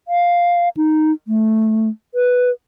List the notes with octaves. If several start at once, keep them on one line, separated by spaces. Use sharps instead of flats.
F5
D#4
A3
B4